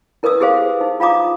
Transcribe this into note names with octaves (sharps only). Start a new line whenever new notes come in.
E4 A#4 B4 C#6 D#6 E6
E4 G4 G#4 C5 F5
D#4
F4 F5 A#5 D6 D#6